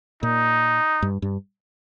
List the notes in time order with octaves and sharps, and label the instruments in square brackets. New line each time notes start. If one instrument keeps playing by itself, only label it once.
[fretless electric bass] A#2 [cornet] D#4
[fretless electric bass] G2
G2